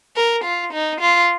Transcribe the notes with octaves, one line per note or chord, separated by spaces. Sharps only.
A#4
F4
D#4
F4